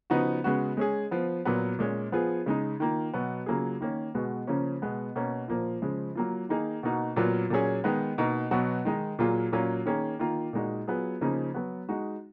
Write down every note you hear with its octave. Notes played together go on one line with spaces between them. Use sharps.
C#3 F3 B3 D#4 F#4
C#3 G#3 B3 F#4
G#3 C#4 G#4
F3 B3 F4
A#2 F#3 B3
A#2 G#3 C#4
F3 B3 F4 G#4
C#3 G#3 D#4
D#3 A#3 F4
B2 F#3 B3
C#3 F#3 A#3 F4 G#4
D#3 A#3 C#4
B2 G#3 B3 F#4
C#3 F3 A#3 C#4
B2 G#3 B3
B2 A#3 C#4
A#2 F3 A#3 F4
C#3 F3 G#3
F#3 A#3 F4
D#3 A#3 D#4 G#4
B2 A#3 D#4 F#4
A#2 F#3 B3 F4
A#2 F#3 C#4 G#4
D#3 G#3 B3 D#4
B2 A#3 D#4
B2 F#3 B3 F#4
D#3 G#3 D#4
A#2 F#3 A#3 F4 G#4
A#2 F#3 A#3 C#4 F4
D#3 A#3 C#4 G#4
D#3 A#3 F4
A#2 G#3 D#4 F#4
F#3 B3 F4 G#4
C#3 F3 A#3 D#4 G#4
F#3 B3 F#4
G#3 D#4 F#4